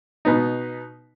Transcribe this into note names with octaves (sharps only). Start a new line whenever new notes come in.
B2 B3 D#4